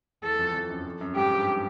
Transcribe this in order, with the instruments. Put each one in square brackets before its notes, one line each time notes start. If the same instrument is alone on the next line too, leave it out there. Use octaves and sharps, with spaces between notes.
[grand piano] E2 [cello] A4
[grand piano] F2
F2
F#2
F2
F#2
[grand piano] G#2 [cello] G4
[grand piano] G2